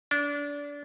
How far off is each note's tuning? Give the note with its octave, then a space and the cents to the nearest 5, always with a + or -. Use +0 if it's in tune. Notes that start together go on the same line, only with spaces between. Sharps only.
D4 -25